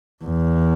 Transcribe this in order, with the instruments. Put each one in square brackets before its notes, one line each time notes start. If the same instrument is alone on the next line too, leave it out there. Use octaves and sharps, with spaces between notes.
[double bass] E2